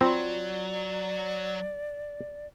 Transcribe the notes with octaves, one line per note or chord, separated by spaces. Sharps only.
F#3 C4 F4 D5 B5 C6